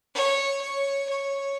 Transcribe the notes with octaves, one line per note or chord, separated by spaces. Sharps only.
C#5
C#5
C#5